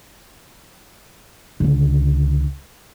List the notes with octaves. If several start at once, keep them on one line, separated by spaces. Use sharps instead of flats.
C#2 D3